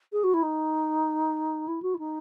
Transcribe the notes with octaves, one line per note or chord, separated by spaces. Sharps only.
G#4
F#4
E4
D#4
E4
F#4
E4
D#4